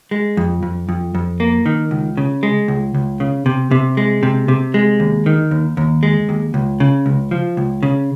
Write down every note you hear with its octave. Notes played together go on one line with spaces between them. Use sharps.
G#3
F2
F2
F2
F2
A#3
D#3
C#2
C#3
G#3
C#2
C#2
C#3
C3
C3
G#3
C3
C3
G#3
D#2
D#3
D#2
D#2
G#3
D#2
C#2
C#3
C#2
F3
C#2
C#3